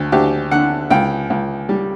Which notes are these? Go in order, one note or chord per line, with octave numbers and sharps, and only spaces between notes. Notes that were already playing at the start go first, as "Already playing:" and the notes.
Already playing: D2
D2 G4
D3 F#5
C#2 G5
C#2
G3